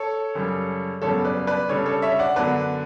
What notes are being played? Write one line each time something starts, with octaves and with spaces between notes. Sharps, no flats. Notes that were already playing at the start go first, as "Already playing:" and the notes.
Already playing: A4 C#5
F#2 C#3 G3
F#2 C#3 G3 B3 A4 C#5
B4 D5
B4 D5
C#3 G3 D4 A4 C#5
A4 C#5
C#5 E5
D5 F#5
F#2 D3 F#3 B3 D4 B4 D5